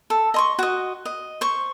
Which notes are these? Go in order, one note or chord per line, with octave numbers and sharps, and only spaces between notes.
A4
D#5 C6 C#6
F#4 D#5
D#5
C5 C#6